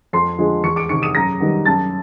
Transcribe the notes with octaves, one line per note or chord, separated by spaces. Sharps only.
F2 C6 C7
D3 F3 G#3
E2 C#6 C#7
D6 D7
C3 D#3 C#6 C#7
D#6 D#7
F#2 A#5 A#6
D#3 G3 B3
F#2 A5 A6